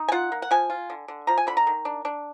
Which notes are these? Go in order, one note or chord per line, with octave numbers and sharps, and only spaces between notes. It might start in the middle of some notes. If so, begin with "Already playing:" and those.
Already playing: D#4
G#5
F4 F#5
A#3
F#5
F3 G#5
F4
D3
D3
F3 A#5
G#5
D3 B5
A#5
D#3
D4
D4